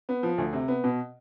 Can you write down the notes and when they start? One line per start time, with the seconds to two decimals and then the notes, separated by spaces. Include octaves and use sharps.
0.09 B3
0.23 F3
0.38 D2
0.53 C3
0.68 B3
0.84 B2